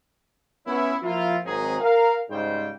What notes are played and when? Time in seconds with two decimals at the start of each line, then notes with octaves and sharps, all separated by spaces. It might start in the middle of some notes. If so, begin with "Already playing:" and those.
0.66 B3 C#4 E4
1.03 F3 A#3 E4 F4
1.44 G#1 D#3 F#3 C4 D#4 G#4
1.80 A#4 F5
2.30 G#2 C#3 G3 D#4 C5 G5